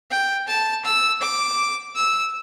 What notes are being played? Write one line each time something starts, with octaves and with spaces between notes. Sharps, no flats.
G5
A5
E6
D6
E6